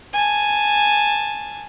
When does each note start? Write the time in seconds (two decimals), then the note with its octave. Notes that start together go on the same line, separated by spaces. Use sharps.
0.13 G#5 A5